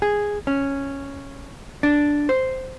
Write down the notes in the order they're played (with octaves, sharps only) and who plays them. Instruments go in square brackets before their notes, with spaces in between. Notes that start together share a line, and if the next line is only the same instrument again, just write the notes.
[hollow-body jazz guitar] G#4
C#4
D4
C5